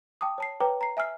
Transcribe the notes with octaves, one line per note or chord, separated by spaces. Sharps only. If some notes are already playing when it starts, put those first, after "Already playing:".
G5 A5 D6 D#6
C#5 A5 C7
B4 C#5 G5 A#5 D6
A#5 C7
E5 G#5 E6 F6 C7